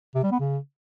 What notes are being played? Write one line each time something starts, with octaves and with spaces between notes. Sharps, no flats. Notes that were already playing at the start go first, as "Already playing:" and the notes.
C3
G3
B3
C#3